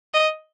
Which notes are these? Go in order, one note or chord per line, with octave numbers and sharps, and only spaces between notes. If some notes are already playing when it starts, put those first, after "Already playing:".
D#5